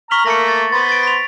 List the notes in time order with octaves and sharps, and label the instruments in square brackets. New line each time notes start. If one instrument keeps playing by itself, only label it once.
[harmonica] A#5 F6 [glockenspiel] C#6 B6 F#7
[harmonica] A3 A#3 [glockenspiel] A#6 C#7
[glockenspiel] A6
[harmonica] B3 C5 C6 [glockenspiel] A6
[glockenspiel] A6 D7
B6 F7